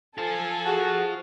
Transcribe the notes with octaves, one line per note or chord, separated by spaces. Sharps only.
F4 A4 C5 G#5
F#4 G#4